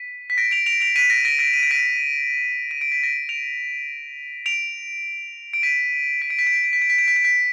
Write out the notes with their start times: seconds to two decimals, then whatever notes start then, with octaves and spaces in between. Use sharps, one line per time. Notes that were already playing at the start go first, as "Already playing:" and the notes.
Already playing: B6 D#7
0.30 B6
0.38 A#6 D7
0.51 D7 F7
0.66 D7 F7
0.80 D7 F7
0.96 B6 D#7
1.10 A#6 D7
1.25 A#6 D7
1.39 A#6 D7
1.54 D#7
1.63 D7
1.71 B6 D#7
2.71 D#7
2.81 D7
2.92 B6
3.03 A#6 D7
3.29 D7 F7
4.46 D7 F7
5.53 D7
5.62 B6 D#7
6.22 B6
6.30 D7
6.39 B6
6.47 D7
6.55 B6
6.64 D7
6.73 B6
6.82 D7
6.90 B6
6.98 D7
7.08 B6
7.16 D7
7.25 B6